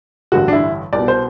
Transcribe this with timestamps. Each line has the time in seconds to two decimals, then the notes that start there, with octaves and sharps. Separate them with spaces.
0.32 A1 G2 D3 F#4
0.48 D4
0.53 E4
0.93 C2 D5
0.98 B2
1.08 C5